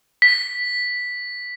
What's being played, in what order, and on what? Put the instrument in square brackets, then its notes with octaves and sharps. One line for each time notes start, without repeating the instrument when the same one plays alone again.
[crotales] B6